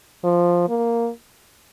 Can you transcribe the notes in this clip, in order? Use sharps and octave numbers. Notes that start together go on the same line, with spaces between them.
F3
A#3